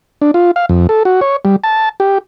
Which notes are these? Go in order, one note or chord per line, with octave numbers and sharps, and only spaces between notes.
D4
F4
F5
F2
A4
F#4
C#5
G3
A5
G4